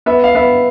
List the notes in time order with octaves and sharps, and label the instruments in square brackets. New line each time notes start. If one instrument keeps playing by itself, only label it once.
[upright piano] B3 [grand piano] E5
[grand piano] F5
[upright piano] B3 [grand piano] E5